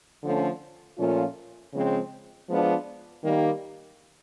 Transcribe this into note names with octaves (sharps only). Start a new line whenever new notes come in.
D3 F3 A3 C#4
A#2 F3 A3 C#4 F4
C#3 F3 G#3 C4
F3 G#3 B3 D4 F4
D#3 G3 A#3